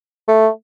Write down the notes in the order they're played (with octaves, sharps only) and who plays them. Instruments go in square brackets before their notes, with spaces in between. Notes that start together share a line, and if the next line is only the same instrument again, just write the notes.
[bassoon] A3